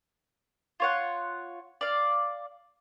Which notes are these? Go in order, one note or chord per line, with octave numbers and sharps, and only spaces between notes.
F4 C#5 F#5
D5 F5